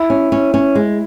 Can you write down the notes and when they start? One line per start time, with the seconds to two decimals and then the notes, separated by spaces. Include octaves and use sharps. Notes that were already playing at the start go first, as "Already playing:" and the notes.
Already playing: E4
0.10 C#4
0.32 C#4
0.54 C#4
0.75 G#3